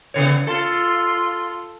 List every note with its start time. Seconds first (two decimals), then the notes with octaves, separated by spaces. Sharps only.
0.14 E2 C#3 C#5
0.47 F4 A4 C6